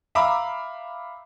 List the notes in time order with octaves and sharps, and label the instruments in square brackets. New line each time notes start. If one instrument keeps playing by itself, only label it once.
[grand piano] E5 F5 A#5 B5 D6 E6